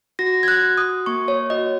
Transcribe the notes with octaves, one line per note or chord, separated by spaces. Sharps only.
F#4 A#6
G#6
F#6
F#4
D#6
A#3 C#6
C#5
F#4 D#5